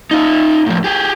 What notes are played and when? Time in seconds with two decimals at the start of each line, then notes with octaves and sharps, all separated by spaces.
0.11 D#4 F4
0.66 A2 F3
0.84 G4 G#4